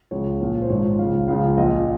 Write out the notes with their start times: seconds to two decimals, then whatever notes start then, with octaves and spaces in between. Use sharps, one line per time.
0.11 C#2 C#3 F3 C#5
0.41 A#1 A#2 F3
0.62 C5
0.70 G#1 G#2 F3 C#5
0.99 C#2 C#3 F3 F5
1.28 C#2 C#3 F3 F5
1.57 A#1 A#2 F3 D#5